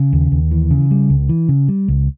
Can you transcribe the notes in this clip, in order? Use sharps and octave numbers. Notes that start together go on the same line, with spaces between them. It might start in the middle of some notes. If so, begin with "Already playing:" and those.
Already playing: C#3
D#2
D#2
E3
C#3
G3
C#2
E3
C#3
G3
C#2